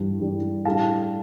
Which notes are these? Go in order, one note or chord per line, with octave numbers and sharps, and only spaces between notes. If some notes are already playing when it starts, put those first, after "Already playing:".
Already playing: G2 E3 G3 D4
G2 E3 G3 D4
A2 G3 D4 F5 A5